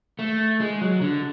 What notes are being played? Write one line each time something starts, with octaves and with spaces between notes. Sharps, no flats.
A3
G#3
F#3
D3